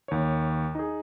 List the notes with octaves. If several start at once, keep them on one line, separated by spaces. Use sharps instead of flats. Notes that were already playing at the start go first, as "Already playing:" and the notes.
D#2 C#5
D#4 G#4